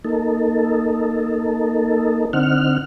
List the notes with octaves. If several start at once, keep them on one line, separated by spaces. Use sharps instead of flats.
A#3 D#4 A4
D3 C4 D#4 F#5 F6